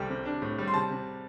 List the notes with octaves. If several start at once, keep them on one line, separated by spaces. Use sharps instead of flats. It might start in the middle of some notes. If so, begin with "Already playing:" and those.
Already playing: C2 G3 A3 G5
C3
D4
A2
G3
C6
C3 A5
C3